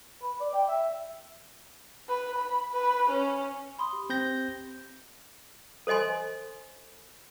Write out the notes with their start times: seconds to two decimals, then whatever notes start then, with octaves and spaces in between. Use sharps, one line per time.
0.22 B4
0.40 D5
0.54 G5
0.68 E5
2.08 B4
2.38 B5
2.72 B4
3.10 C#4
3.79 B5 C6 D#6
3.93 G4
4.10 C4 G6 A#6
5.87 A4 C5 D#5 G#5 C6